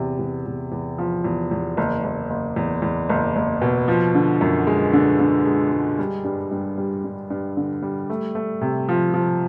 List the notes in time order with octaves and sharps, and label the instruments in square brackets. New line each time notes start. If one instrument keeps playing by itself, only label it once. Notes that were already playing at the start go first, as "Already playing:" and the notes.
Already playing: [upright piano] E2 C3
E2
E2
E2
F3
E2
E2
F#1
F#1
F#1
E2
E2
F#1
F#1
B2
F3
D3
F#2
G#3
D3
D3
G#3
G#3
G3
G2
G2
G3
G2
G2
D3
G3
A3
A3
C3
F3
F3